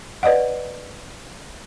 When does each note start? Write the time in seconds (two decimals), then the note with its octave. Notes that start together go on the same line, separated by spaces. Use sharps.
0.23 B4 D5 D#5 F#5